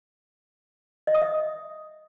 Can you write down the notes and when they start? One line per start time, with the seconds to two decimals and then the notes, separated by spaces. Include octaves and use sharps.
1.07 D#5
1.14 D#6
1.22 E5